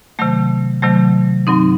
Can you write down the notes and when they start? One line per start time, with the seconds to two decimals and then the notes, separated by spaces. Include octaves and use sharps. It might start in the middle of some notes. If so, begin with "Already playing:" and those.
0.19 C3 D#3 F#3 A3
0.82 C3 D#3 F#3 A3
1.47 G2 F#3 C4 D#4